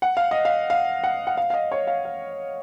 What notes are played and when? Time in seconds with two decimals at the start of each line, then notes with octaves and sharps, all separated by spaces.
0.02 F#5
0.17 F5
0.31 D#5
0.45 F5
0.70 F5
1.04 F#5
1.27 F#5
1.37 F5
1.50 F5
1.54 D#5
1.72 C#5
1.87 F5
2.05 F5